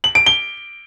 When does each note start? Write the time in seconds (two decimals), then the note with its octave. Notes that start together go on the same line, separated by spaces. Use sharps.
0.04 F#7
0.15 D7
0.26 G7